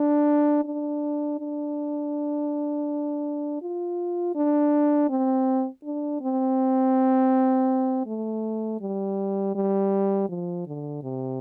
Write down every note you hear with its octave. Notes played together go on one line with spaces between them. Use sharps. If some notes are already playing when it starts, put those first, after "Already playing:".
Already playing: D4
D4
D4
F4
D4
C4
D4
C4
A3
G3
G3
F3
D3
C3